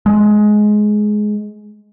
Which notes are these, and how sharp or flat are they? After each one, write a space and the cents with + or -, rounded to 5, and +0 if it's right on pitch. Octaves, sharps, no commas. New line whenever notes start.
G#3 +15